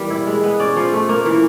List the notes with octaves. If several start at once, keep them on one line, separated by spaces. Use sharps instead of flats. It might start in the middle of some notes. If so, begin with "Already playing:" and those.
Already playing: E3 G3 A#3 F5
E4
G#3
B3
C#4 D5
F3
A3
A#3
E3